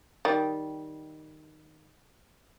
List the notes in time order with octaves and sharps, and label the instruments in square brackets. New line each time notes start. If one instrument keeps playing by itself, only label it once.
[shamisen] D#3 G3